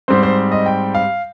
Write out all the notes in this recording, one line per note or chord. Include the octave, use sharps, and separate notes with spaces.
G#2 G3 C4 C5
C5
D#5
G5
F5